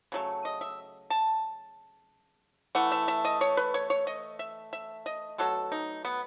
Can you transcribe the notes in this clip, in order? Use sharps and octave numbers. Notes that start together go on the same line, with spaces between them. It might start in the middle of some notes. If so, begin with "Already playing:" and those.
C#3 F#3 A3
D#5
E5
A5
E3 A3 F#5
E5
E5
D#5
C#5
B4
C#5
C#5
D#5
E5
E5
D#5
B2 F#3 A3 A4
D#4
B3